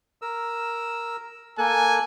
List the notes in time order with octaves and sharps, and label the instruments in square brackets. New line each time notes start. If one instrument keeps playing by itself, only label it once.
[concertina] A#4 E6
[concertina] A#3 A4 F#6 [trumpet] G#5